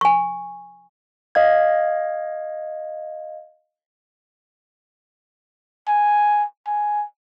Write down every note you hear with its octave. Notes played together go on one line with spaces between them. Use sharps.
G#5 C#6
D#5 F5 G#6
G#5
G#5